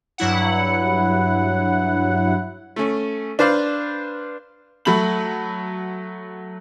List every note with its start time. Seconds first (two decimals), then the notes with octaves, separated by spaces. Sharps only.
0.18 G2 F#3 E4 F#5
2.76 A3 C#4
3.39 D4 B4 C5 D5 F5
4.85 F#3 A3 B5 F#7